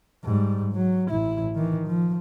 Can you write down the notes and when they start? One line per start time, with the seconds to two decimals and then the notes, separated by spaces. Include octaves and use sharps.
0.24 G#2 G3
0.73 F#3
1.10 A1 E4
1.55 D#3 E3
1.87 F3